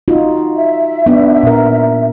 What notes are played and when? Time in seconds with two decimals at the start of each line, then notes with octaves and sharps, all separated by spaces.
0.08 D#4 F4 F#4
0.55 E5
1.06 B3 D4
1.43 A#2 A#4